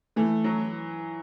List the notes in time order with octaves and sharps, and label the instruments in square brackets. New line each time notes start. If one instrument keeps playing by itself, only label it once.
[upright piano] E3 [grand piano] A3
[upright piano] F#3